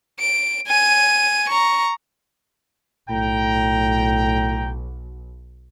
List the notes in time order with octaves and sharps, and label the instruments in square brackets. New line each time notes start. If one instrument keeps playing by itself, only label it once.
[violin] D7
G#5 D#7
A#5 C#6
[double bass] B1 [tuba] A2 [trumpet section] G5 A#5